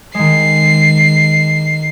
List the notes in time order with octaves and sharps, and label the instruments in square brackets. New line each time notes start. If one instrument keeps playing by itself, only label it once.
[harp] D#3 G#3 [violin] C7